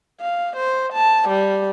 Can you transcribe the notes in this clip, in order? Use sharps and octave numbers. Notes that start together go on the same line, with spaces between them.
F5
C5
A5
G3